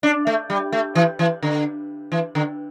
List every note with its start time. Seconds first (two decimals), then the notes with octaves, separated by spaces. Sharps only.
0.03 D4
0.27 A3
0.50 G3
0.72 A3
0.95 E3
1.19 E3
1.43 D3
2.12 E3
2.35 D3